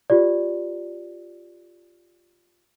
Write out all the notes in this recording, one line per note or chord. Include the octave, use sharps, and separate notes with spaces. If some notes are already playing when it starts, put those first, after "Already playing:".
F4 G4 D5